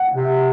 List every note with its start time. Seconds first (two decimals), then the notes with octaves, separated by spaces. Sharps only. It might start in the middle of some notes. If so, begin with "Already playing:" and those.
Already playing: F#5
0.15 C3